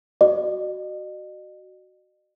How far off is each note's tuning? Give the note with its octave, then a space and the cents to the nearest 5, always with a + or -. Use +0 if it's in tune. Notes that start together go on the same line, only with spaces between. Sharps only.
F#4 +10 D#5 -45